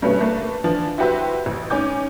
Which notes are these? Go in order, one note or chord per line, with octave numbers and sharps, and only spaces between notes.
G2 B2 A3 B3 C#4
A3 A#3 B4
D3 E3 F3
E4 F#4 G4 B4 C5 E5
A1
G#2 C#4 G#5 D6 G6